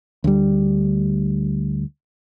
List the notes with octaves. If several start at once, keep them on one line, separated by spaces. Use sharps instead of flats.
D2 G3